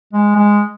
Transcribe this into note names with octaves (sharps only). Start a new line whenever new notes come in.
G#3
G#3